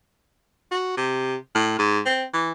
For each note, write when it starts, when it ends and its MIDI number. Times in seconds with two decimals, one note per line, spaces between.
0.71 0.96 66
0.97 1.36 48
1.55 1.74 45
1.79 2.00 44
2.06 2.25 60
2.33 2.52 52